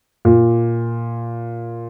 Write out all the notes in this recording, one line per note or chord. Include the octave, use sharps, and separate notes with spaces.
A#2